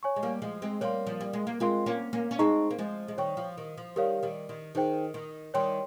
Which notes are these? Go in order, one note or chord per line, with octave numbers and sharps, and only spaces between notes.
C#5 G#5 C#6
G#3
G3 A#3
F3 G#3
G#3 C4
G3 A#3 C#5 F5 C6
F3
G3
G#3
A#3
G#3 C4 F4 A#4 F5 C6
A#3 C#4
A#3 C#4
C#4
G#3 C4 D#4 G#4 D#5 A#5 C#6
A#3
F3 G#3
G#3
D#3 G3 C#5 G5 C#6
F3
D#3
F3
D#3 G3 G4 A#4 C#5 F5
D#3 G3
D#3
D#3 D#4 G#4 C5 G5
D#3
D#3 G3 C#5 G5 C6